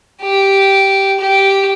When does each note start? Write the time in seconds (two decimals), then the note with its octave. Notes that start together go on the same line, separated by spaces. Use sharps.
0.22 G4
1.20 G4